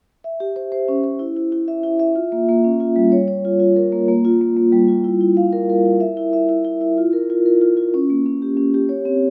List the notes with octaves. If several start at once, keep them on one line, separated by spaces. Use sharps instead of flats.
E5
G4
C5
C5
C#4
C5
E4
E4
E4
E5
E4
E5
F4
A#3
A#3
C#4
F4
G3
C#5
C#5
F4
F4
A#4
A#3
A#3
F4
A#3
A#3
G3
F4
E4
E4
F5
A#4
A#4
E4
E5
E4
E5
E4
E4
E4
F4
A#4
F4
A#4
F4
F4
C#4
A#3
C#4
G4
C#4
G4
C#5
C4